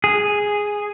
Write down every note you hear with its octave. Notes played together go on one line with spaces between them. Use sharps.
G#4